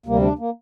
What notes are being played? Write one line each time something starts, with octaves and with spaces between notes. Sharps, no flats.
D2 C3 G3 A#3
D4
A#3